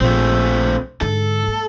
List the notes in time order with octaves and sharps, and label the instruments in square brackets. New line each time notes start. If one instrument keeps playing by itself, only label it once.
[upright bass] A#1 [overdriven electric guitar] A3 C4
[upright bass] G#2 D3 [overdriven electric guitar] A4
[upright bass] A#3